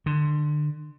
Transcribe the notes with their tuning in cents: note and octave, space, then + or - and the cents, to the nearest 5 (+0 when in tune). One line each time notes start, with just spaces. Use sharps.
D3 +25